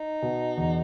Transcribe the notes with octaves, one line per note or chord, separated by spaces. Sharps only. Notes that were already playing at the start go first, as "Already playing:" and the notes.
Already playing: D#4
B2
E2